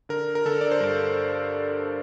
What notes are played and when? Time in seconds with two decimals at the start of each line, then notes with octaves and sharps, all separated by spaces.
0.09 D3 A#4
0.35 A#4
0.46 D3 A4
0.61 D5
0.71 C5
0.80 G2 A#4